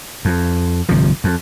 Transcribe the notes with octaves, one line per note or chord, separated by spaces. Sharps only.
F2
G1 C3 F3
F2